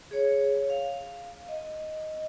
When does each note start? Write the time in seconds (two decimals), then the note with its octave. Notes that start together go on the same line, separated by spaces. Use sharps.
0.11 G#4 C#5
0.70 F5
1.49 D#5